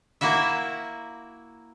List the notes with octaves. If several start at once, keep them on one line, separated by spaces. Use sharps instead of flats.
A#3 E4 F#4 E5